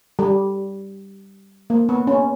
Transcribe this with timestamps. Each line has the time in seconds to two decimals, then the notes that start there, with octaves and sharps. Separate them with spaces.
0.19 G3
1.70 A#3
1.89 B3
2.07 C#4